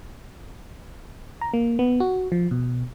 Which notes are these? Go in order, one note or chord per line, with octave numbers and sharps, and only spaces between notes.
A#5
A#3
B3
F#4
F3
B2